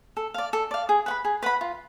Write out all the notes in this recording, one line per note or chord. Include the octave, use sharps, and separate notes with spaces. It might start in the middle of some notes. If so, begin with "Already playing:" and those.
A4
D5 F5
A4
D5 F5
G#4
B4 F#5 B5
G#4
B4 F#5 B5
F4